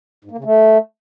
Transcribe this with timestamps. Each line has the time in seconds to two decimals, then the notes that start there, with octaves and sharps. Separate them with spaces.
0.24 G#2
0.31 A#3
0.38 C#3
0.44 A3